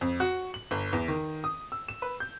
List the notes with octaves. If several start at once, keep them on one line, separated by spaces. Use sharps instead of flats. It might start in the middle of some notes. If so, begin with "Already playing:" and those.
F2
F#4
F#7
G1
E2
D#3
D#6
E6
E7
B4
G6